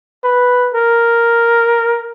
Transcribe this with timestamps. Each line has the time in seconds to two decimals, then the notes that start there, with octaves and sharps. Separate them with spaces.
0.24 B4
0.74 A#4